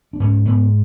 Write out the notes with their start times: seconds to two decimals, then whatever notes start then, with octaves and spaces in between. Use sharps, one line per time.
0.13 D4
0.20 G#2 C#4
0.46 G#2 B3